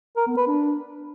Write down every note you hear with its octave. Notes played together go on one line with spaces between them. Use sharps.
A#4
B3
B4
D4